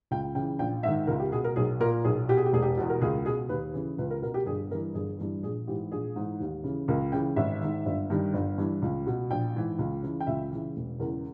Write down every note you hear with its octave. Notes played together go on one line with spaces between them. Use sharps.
C#2 G5
C#3 E3 G5
A#1 G5
G#2 D#3 E5
C#2 A#4
G4
B2 G#4
A#4
B1 G#4
A#2 A#4
B1 G#4
B2 G4
G#4
G4
E1 G#4
G4
E2 B2
A#4
C#2 G#4
B2 G#4
D#2 B4
C#3 E3
C#2 B4
A#4
B2 A#4
G4
G1 G#4
G2 E3 A#4
G1 G#4
G2 E3
A#1 G#4
G#2 E3 G4
A#1 G#4
G#2 E3
D#2
C#3 E3
C#2 A#4
C#3 E3 G5
G#1 E5
G#2 D#3
G1
G2 D#3
G1
G2 E3
C#2
B2
A#1 G5
G#2 E3
C#2
C#3 E3
G5
C#2 E5
C#3 E3
E1
E2 C#3 E3 A#4